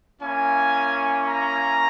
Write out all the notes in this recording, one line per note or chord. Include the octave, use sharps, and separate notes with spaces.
A#3 C#4 E4 G#5
A#5